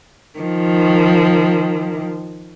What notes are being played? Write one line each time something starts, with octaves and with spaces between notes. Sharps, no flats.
D#3 F3